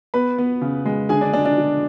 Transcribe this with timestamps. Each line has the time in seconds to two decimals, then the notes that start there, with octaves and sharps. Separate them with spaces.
0.14 B3 B4 B5
0.38 B3
0.62 C#3
0.86 G#3
1.09 D3 G#4 G#5
1.21 D4 D5
1.33 G#3 D4 D5
1.46 D4 D5
1.58 D3